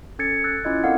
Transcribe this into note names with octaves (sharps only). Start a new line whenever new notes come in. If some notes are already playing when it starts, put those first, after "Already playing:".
C#4 A4 G#6 A6 C#7
E6 F#6 A6
C#4 E4 F4 D#5 G#6
C4 A4 A#4 D5 F5 F#5